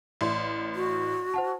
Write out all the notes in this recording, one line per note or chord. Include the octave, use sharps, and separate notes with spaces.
A1 D5 C6
F#4
C5 F#5 A5